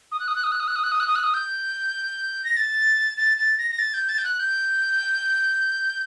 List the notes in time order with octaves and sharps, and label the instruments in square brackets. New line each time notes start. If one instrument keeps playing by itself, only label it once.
[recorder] D#6
F#6
D#6
F#6
D#6
F#6
D#6
F#6
D#6
F#6
D#6
F#6
D#6
F#6
D#6
G6
A#6
A6
A6
A6
A#6
A#6
A6
G6
A6
G6
F#6
G6